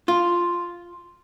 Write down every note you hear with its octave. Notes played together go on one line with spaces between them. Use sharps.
F4